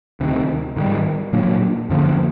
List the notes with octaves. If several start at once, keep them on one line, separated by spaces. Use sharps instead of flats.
D2 C3 D#3
G#2 D#3 G3
A#2 F#3 A#3 D4
F#2 D3 F3 A#3